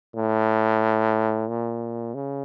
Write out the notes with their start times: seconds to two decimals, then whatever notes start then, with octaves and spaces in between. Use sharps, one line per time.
0.16 A2
1.48 A#2
2.14 C#3